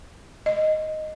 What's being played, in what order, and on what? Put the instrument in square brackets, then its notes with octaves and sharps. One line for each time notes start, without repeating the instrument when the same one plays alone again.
[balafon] D#5